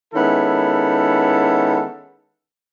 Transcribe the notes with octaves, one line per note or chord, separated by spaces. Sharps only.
D#3 G#3 B3 C#4 E4 A4